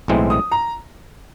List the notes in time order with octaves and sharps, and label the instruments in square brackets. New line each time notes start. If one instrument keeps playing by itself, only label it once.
[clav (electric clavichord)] B1 A2 E3 G#3 C4
[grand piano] D#6
A#5